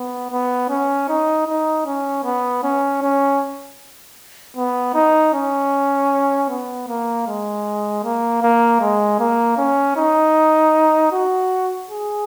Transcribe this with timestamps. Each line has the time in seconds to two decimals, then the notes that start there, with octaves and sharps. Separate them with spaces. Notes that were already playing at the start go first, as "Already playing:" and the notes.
Already playing: B3
0.31 B3
0.69 C#4
1.08 D#4
1.47 D#4
1.86 C#4
2.24 B3
2.63 C#4
3.02 C#4
4.57 B3
4.94 D#4
5.34 C#4
6.49 B3
6.88 A#3
7.27 G#3
8.04 A#3
8.43 A#3
8.81 G#3
9.19 A#3
9.58 C#4
9.97 D#4
11.12 F#4
11.90 G#4